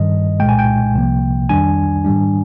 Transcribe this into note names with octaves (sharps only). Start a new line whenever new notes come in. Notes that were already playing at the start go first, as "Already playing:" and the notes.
Already playing: G2 D#3 G3 D#5
C2 A#2 G#3 G5
G#5
G5
C2 C3 F3 A#3
F2 D#3 G3 D4 G#5
G#2 D#3 G3 D4